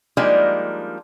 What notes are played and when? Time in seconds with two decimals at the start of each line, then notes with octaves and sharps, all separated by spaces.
0.17 F3 G3 G#3 A#3 D4 D#4